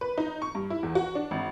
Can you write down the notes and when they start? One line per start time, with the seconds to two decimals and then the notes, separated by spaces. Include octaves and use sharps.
0.01 B4
0.18 D#4
0.42 C#6
0.55 G2
0.70 E4
0.83 E2
0.95 F#4
1.15 D4
1.31 G#1